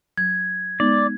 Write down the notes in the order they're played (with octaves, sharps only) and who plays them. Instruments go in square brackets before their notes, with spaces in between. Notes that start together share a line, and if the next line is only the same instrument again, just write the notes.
[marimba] F#3 [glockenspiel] G#6
[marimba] G#3 B3 D#4 [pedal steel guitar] D5